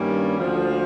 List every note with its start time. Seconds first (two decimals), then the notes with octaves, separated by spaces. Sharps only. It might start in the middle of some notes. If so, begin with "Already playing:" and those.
Already playing: G2 D#3 G3 A#3 C#4
0.36 D2 D3 F3